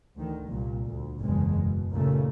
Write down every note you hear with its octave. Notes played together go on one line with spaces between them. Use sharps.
D2 D#3
C2 A#2
D2
F#1 E2 B2 G#3
B2
D#2 A#2 C#3 A3 A#3